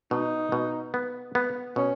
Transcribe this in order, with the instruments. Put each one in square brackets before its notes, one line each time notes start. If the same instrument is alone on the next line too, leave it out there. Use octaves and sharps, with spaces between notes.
[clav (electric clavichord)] B2 [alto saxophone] D#4
[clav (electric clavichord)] B2
B3
B3
[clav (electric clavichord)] B2 [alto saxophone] C#4